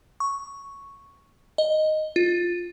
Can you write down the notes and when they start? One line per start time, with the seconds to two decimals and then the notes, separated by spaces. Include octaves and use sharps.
0.20 C#6
1.58 D#5
2.16 F4